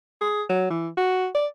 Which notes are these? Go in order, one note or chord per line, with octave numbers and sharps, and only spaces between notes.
G#4
F#3
E3
F#4
D5